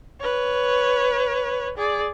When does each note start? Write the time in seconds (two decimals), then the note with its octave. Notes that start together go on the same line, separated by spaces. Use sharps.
0.20 B4 C#5
1.77 G#4 D5